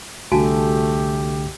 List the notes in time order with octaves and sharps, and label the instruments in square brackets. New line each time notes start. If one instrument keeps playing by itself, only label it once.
[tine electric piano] C2 D3 [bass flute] A3 [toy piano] F#4 G#5 A5 [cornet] G4